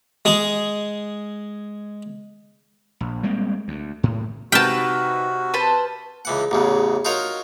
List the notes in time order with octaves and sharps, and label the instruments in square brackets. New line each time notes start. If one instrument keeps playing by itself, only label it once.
[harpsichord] G#3 G#4
[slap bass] A#1
G3 G#3 A#3 C4
D2
A2
[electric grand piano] C3 F6 B6 [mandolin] D#4 B4 [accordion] F#4 [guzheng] G5 A5
[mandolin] B4 C5 A5
[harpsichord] C#2 E3 F#5
A1 E2 C#3
D#4 F4 F#4 A#4 C#5